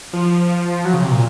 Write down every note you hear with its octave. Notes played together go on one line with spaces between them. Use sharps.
F3
F#3
C#3
C3
A#2